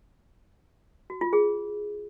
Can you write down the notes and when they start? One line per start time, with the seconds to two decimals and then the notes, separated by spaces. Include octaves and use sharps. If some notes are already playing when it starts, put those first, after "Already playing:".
1.10 F#4
1.21 F4
1.33 G#4